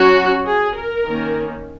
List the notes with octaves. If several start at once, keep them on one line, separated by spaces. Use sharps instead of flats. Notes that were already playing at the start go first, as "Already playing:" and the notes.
Already playing: F#3 C#4 F#4
G#4
A#4
D#3 A#3 C#4